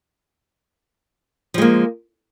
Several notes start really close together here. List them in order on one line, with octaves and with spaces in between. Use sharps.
F3 G#3 A#3